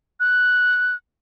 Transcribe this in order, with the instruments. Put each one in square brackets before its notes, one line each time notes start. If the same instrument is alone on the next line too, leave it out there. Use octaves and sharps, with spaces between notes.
[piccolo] F#6